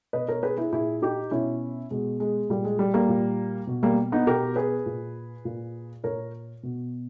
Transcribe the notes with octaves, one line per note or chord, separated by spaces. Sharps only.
B2 B4 D#5
A#4 C#5
G#4 B4
E4 G#4
A#2 E4 G#4
D#4 G4
B2 C#4 E4
B2 G#3
G#3
A#2 G3
G#3
G3
G3 A#3
A#2
B2
G3 A#3
B3 D#4
B2 G4 A#4
G#4 B4
A#2
A#2
A#2 A#4 C#5
B2